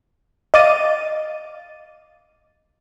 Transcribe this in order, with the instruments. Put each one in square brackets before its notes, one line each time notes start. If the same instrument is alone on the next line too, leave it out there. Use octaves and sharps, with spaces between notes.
[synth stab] D#5 F5 D6 A6 D#7